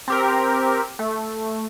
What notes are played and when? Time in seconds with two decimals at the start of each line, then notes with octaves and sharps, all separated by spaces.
0.08 C4 G4 A#4
0.99 A3